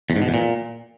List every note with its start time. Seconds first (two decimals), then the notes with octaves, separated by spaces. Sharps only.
0.10 E2
0.16 G#2
0.22 B2
0.28 E2
0.34 A#2